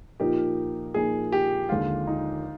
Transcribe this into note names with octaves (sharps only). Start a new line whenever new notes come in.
A#2 F3 A#3 D#4 G4
A#2 F3 A#3 D#4 G#4
G4
D#2 D3 F3 G#3 F4
D#4